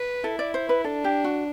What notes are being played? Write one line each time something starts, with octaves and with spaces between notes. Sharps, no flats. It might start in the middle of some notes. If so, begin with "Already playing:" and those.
Already playing: B4
E4 A4
D5
C5
B4
D4 A4
G4
F#4